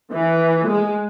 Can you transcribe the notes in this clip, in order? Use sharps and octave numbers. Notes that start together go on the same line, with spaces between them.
E3
G#3